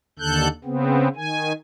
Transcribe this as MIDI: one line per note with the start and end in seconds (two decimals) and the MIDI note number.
0.19 0.48 39
0.19 0.48 50
0.19 0.48 69
0.19 0.48 90
0.19 0.48 91
0.64 1.08 49
0.64 1.08 59
0.64 1.08 60
1.16 1.52 51
1.16 1.52 80